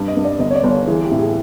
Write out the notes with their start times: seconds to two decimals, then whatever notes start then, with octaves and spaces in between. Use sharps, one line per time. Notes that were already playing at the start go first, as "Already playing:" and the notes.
Already playing: G2
0.08 D#5
0.17 G2
0.25 D5
0.39 G1 D#5
0.51 C#5
0.56 D5
0.64 G1
0.71 C#5
0.87 E3 G#4
1.04 G4
1.11 A2
1.19 G#4